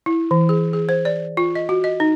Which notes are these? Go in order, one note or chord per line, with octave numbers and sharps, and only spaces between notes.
E4
E3
G#4
G#4
C5
D5
F4
D#5
F#4
D#5
D#4